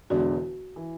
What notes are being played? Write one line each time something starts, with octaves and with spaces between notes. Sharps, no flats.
E1 E2 D3 G#3 D4 F#4
E3